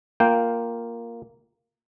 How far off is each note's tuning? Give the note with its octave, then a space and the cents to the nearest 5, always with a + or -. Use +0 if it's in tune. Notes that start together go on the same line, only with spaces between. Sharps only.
A#3 +0 F4 +0 G5 +0